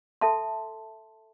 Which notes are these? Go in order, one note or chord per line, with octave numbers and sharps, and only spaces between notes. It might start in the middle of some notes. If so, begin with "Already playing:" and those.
A4 E5 A5 C6